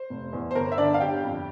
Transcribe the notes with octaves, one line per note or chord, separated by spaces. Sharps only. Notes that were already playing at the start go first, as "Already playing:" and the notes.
Already playing: C5
F1
E2
C5
G1 A#4
E5
D3 D4 D5
F5
G1 G4 G5
F2